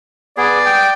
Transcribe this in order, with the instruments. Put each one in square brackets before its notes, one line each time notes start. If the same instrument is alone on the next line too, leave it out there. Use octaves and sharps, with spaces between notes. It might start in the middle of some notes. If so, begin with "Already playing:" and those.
[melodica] B3 G#4 [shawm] D5
[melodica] G5